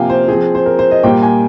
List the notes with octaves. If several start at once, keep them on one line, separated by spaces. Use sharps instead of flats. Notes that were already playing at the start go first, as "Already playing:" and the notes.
Already playing: C3 F3 A#3 F5 G5 G#5
C5
F3 C4 G#4
C5
A#4
C5
D#5
A#2 G3 A#3 G5
G#5